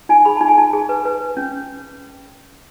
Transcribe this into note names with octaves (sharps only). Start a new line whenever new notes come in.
D#4 G#5
G#4 B5
D#4 A5
G#5
D#4 A5
G#4
B4
B4
B4
C#4